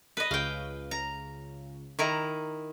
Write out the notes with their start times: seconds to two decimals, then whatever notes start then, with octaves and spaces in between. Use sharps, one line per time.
0.17 B4 D#5
0.31 C#2 F5 G5
0.91 A#5
1.99 D#3 E4 A#5